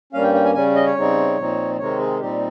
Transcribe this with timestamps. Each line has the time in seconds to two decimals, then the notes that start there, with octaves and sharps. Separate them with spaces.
0.13 G2 G3 A#3 C#4 F5
0.24 G5
0.34 G5
0.44 G#5
0.54 C#3 G3 C#4 G#5
0.76 D#5
0.86 C#5
0.96 C#3 G3 C4 D#4
1.37 A#2 F3 C4 D#4
1.79 C3 D#3 G#3 C4 D#4 C#5
1.99 G#4
2.20 A#2 G3 C4 D#4 G4